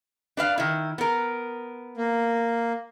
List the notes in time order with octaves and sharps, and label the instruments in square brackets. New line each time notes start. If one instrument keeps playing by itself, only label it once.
[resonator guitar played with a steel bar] D4 B4 F5
D#3 E4
B3 A#4
[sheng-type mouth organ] A#3